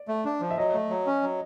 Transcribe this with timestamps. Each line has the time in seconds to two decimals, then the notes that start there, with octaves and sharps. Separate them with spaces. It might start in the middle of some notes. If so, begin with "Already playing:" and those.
Already playing: D5
0.08 A3
0.25 D4
0.41 F3
0.51 E5
0.57 F#3 D#5
0.74 A3
0.90 F#3
1.07 C#4
1.22 F#3